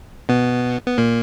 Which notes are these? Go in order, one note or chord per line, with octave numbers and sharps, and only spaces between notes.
B2 B3
B3
A#2 A#3